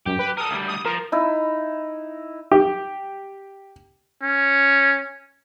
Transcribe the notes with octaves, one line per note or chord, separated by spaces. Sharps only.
F#2 G4
B4
A4 A#4 D#6
D2 G3
D#6
F3 A#4
D#4 E4
G4
C#4